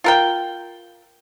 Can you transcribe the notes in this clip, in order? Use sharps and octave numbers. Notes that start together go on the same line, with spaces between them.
F4 A#4 G5